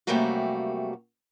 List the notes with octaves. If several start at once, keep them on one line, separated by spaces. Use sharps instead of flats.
F#2 C3 G3 A3 A#3 F#4